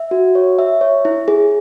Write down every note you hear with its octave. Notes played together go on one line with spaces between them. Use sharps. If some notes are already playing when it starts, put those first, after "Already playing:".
Already playing: E5
F#4
C#5
E5
C#5
E4
G#4